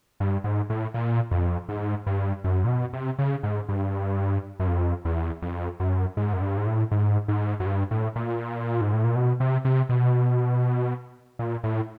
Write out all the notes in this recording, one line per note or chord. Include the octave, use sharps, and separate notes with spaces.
G2
G#2
A2
A#2
F2
G#2
G2
F#2
A#2
B2
C3
C#3
G#2
G2
F#2
F2
E2
F2
F#2
G#2
F#2
G2
G#2
A2
G#2
G#2
F#2
G2
A2
A#2
G#2
A2
A#2
B2
C3
C3
B2
A#2
A2